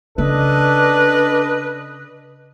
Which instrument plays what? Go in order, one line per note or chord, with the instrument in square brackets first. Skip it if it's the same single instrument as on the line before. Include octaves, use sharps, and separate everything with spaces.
[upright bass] C#3 [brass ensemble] D4 A4 D#5 [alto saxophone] B4